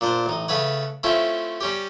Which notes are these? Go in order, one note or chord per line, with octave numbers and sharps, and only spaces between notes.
A#2 D4 C5
A1 D#4
C#3 A3 B4 C#5 F#5
A3 C4 C#4 E4 F4
G3 C#4 G4